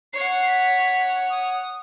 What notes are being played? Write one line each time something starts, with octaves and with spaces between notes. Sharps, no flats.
C#5 F#5 C7
B6
D#6